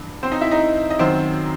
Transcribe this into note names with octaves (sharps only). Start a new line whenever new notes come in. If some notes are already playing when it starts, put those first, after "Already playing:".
Already playing: G2 E3
C4 C5
D#4 D#5
E4 E5
D#4 D#5
D#5
F#2 D#3 F#3 C4 C5